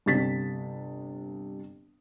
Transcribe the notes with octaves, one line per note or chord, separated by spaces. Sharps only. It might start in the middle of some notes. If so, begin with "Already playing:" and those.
G1 C3 A6 B6